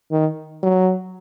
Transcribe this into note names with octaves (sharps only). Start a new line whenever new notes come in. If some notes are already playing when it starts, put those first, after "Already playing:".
D#3
F#3